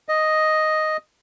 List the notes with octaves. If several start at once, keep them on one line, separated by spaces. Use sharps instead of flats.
D#5